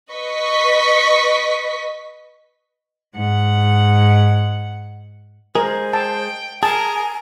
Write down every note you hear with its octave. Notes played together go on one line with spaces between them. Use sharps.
B4 D#5 C#6 B6
G#2 F#5
G#3 G#4 A#4 C5
G5 A5
G#4 A#4 G#5 A5